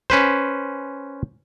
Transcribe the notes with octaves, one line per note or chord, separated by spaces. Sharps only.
C#4 B4 C5